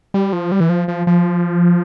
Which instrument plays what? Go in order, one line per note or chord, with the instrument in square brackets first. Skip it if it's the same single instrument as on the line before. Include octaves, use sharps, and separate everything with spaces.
[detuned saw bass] G3
F3
G3
E3
F3
F3
F3